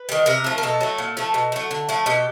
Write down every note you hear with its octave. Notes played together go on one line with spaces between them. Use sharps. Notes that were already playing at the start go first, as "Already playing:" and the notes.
Already playing: B4
D#3 G3
C3 A#4
F3 A3
A#4
B2 A4
F#3 A3
A#2
F3 A3
B2
F#3 A3
D3
F3 A3
B2 G4